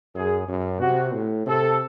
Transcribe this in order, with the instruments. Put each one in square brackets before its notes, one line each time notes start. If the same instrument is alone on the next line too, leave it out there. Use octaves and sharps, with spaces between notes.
[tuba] F#2 [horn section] G#4
[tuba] F#2
[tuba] C3 [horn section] F#4
[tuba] A2
[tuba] C3 [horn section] A4